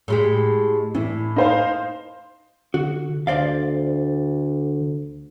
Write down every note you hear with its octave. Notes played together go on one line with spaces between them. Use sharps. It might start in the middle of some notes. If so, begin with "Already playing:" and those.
A2 G#3 G4
A2 E3
D#4 C5 F5
D3 F#4
D2 D3 C5 D5 F5